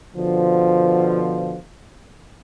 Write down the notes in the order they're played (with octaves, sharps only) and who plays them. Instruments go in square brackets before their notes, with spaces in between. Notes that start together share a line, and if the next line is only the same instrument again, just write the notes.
[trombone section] B2 D3 F3